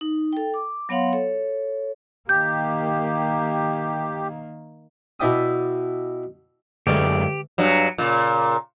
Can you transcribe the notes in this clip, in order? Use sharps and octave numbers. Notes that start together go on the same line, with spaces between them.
D#4
A4 G5
D6
F#3 B3 C#5 F5 F#5 C6
A4 C#5
D#3 A#3 G4 G6
B2 E4 D5 G5 D#6
C#2 F#2 D3 A3 G4 G#4 D5
G2 F#3
A#2 C#3